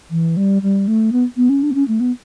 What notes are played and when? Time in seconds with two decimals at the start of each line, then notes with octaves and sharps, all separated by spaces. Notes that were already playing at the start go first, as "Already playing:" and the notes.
0.11 E3
0.37 G3
0.62 G3
0.88 A3
1.12 B3
1.37 B3
1.49 C#4
1.63 D4
1.71 B3
1.75 C#4
1.88 A3
2.00 B3